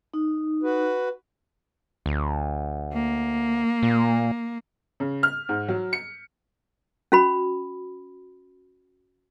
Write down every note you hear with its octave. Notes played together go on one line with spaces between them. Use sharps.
D#4
F#4 B4
D2
A#3
A#2
C#3
F6
G#2
F#3
C#7
C#4 F#4 B5